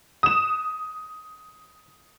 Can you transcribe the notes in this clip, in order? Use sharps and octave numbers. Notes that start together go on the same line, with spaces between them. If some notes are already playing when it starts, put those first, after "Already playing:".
D#6 E7